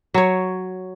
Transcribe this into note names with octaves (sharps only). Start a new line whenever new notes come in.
F#3 C#5